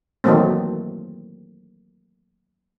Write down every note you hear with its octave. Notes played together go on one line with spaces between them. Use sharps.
D#3 E3 F#3 A3 A#3 C4